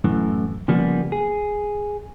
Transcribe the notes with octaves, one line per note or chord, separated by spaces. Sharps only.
F#2 A2 E3
C#3 F3 G3 A#3 B3
G#4